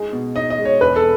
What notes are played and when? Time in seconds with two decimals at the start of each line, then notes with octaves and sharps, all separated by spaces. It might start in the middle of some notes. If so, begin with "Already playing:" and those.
Already playing: G#3 D#4 G#4
0.13 B2
0.35 D#4 D#5
0.50 D#5
0.58 G#3
0.65 C#5
0.81 E1 B4
0.96 A4